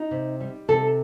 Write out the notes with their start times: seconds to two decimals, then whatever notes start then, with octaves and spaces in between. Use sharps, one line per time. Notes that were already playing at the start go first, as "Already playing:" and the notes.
Already playing: D#4
0.11 C3
0.41 G3
0.68 C3 A4